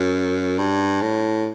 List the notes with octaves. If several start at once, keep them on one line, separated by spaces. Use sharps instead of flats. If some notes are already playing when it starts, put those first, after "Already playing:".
Already playing: F#2
G2
A2